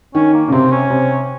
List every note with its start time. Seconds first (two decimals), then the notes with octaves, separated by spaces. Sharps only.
0.15 D#3 C#4
0.34 A#3
0.48 C#3
0.52 C3 C4
0.71 C#4
0.90 C3